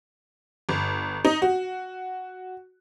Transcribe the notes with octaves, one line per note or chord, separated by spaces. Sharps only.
G1
D#4
F#4